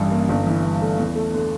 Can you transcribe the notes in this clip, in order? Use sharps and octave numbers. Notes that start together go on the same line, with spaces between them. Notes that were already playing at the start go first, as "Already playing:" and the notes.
Already playing: A1 G2 E3
A#3
G1
E3
G2
A3
E2
A3
D3